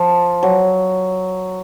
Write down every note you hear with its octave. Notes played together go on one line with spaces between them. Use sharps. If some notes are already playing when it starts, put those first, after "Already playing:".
Already playing: F3
F#3